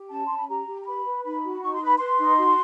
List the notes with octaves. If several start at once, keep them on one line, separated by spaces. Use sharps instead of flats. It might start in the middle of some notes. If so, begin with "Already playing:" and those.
Already playing: G4
C#4 A5
C#4 C6
B5
G4 A#5
G4
A#5
B4 B5
B4
D#4 B5
F#4
D#4 C#6
C6
B4 B5
B4 C6
D#4
F#4